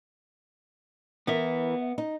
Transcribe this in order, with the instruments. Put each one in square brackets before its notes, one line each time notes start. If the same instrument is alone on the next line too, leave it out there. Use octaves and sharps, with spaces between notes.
[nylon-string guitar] E3 A#4 [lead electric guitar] B3 E5
[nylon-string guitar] D#4